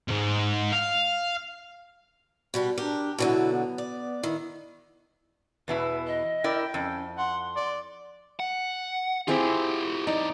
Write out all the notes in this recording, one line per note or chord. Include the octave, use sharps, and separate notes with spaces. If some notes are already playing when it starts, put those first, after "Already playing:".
D#2 G#2
F5
B2 G3 B4
D4 G4 A#4
B2 D3 F#3 E4
B3
D5
D#3 E4
E2 B2 E4 B4
D#5
E4 A#4 D5 G5
F2 C#4
F#5 C6
D5
F#5
C4 E4 F4 G4 G#4
F2 D#4 D5